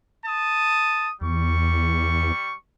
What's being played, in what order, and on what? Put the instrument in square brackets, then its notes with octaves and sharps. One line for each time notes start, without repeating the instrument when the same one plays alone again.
[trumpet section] A5 D#6
[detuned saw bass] E2 [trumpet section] G3 C#6